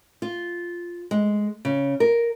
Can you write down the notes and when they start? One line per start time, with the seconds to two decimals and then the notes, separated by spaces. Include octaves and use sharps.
0.22 F4
1.11 G#3
1.65 C#3
2.00 A#4